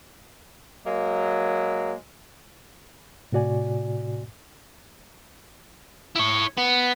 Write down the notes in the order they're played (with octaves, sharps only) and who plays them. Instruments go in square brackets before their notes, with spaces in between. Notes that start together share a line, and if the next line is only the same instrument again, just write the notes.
[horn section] F#3 G#3 A#3
[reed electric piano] A2 C3 F#4 D5 G#5
[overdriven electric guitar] E4 C#5
B3